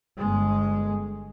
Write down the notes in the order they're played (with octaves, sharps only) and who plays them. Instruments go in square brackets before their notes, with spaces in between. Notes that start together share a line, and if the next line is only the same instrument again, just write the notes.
[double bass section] G1 G#3